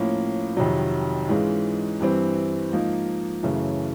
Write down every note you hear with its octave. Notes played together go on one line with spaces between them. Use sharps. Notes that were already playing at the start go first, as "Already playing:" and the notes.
Already playing: A2 F3 A#3 C#4
F2 C3 D#3 F#3
G#2 E3 G#3 C#4 F4
G2 E3 G3 C4
G#2 F3 A#3 D#4
F#2 C#3 E3 A3